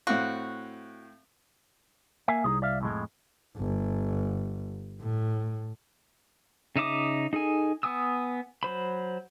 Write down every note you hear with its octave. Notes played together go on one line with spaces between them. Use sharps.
A2 C4 F#4 F5
A#3 E5 F5 G#5
C2 D#4 F4 G#4
D5 E5 F5
F2 A2 G#3
G1
A2
C#3 D#4 E5 D6 D#6
D#4 G#4 A4 G#5
B3 G#5 D#6 E6
F#3 C5 B5